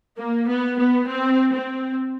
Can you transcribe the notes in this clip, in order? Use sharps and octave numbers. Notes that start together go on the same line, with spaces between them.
A#3
B3
B3
C4
C4